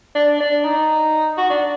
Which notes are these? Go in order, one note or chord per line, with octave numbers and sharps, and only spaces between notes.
D4
D4
D#4
F#4
D4